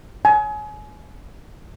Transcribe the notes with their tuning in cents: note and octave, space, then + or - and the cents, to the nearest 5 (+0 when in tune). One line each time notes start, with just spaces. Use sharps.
G#5 +30